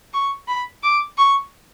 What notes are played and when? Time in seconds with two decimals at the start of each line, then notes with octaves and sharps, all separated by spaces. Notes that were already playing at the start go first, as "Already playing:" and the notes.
0.13 C#6
0.48 B5
0.83 D6
1.18 C#6